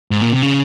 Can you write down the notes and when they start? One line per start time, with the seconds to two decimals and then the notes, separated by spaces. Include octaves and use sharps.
0.11 G#2
0.22 A#2
0.33 C3
0.42 C#3